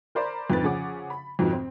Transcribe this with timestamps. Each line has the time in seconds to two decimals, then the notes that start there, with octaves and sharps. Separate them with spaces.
0.15 A#4 C5 D5 A#5 B5
0.50 F2 G#2 B4 A6
0.62 C#3 F3 C#4 G#4 F#5 D6
1.10 B5
1.39 F2 G#2 B2 F3
1.52 C4